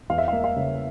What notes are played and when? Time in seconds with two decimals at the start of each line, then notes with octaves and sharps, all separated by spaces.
0.10 E2 F5
0.18 E5
0.28 A#3 F5
0.44 F5
0.56 C#3